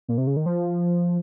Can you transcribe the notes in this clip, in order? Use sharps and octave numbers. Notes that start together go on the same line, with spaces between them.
A#2
C3
C#3
D#3
F3